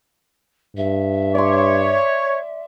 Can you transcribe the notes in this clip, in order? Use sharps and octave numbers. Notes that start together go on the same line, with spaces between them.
G2 E5
C#5 D5 C6